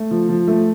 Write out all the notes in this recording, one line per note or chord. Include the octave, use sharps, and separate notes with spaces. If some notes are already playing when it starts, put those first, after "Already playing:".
Already playing: A3
F3
F3
A3